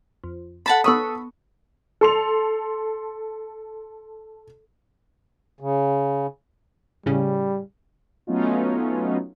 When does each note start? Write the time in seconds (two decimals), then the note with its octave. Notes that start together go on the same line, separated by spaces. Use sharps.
0.24 F2
0.66 A4 F#5 A5 B5
0.84 B3 A4 F#5 B5 C#6 D#6 E6
2.01 A4 C6 F7
5.60 C#3
7.06 A2 C#3 G3 C#4
8.27 F#3 A3 B3 C#4 D#4 F4